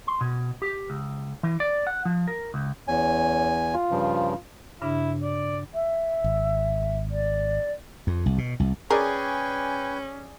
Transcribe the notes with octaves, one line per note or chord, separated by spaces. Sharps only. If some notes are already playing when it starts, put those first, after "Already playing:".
C6
B2
G4
C#2
E3
D5
F#5
F3
A#4
C#2
E2 C#4 G#5
F4
G2 C#3 F3
G2 C#3 D4 E4
D5
E5
G#1
D5
F2
C2
B2
C2
C#4 G#4 A#4 B4 D5 G5 G#5 C#6